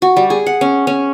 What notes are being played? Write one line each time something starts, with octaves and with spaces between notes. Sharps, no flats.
F#4
G3
G#4
F#5
C#4
C#4